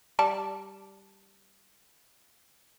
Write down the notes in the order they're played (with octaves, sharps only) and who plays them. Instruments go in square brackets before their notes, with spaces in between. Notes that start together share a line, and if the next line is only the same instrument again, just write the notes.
[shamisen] G3 D5 A5